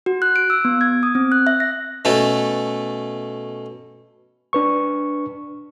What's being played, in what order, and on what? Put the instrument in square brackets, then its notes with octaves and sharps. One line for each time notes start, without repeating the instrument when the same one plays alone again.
[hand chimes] F#4
F#6
D7
E6
B3
G#6
D#6
C4
F#6
E5
A#6
[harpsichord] B2 A3 C#4 A4
[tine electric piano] D4 B4 C#6